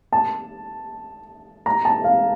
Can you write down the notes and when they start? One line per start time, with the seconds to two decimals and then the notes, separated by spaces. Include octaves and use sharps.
0.12 A5
1.66 A#5
1.85 A5
2.04 F5